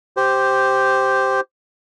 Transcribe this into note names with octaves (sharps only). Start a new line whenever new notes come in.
G4 C5